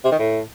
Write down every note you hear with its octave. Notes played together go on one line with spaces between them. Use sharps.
C3
D#3
A2